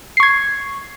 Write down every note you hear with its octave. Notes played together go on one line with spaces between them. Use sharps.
C#6 G#6 C7